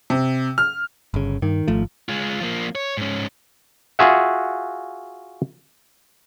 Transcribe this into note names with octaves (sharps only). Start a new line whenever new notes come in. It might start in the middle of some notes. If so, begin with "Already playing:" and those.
C3
F6
G1 C#3
G2 D#3
G#1 F3 A3
G#3 F4
F3 A#3
C#5
G#2 C#4
F4 F#4 G#4 E5 F#5